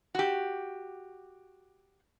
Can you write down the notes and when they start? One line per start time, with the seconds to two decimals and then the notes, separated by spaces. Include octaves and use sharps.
0.15 F#4 G4